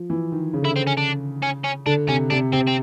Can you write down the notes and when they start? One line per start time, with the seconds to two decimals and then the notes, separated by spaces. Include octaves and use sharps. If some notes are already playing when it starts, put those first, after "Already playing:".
Already playing: F3
0.10 E3
0.32 D#3
0.53 C#3
0.62 D3 E4
0.71 C#3
0.76 C4
0.87 C#4
0.97 D4
1.42 C#4
1.64 C#4
1.86 D3 D4
2.08 C3 C#4
2.30 C3 D4
2.53 C3 C4
2.67 C4